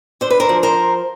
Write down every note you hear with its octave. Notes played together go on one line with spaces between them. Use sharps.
D3 C5
B4
A#4 C5
F3
A#4 C5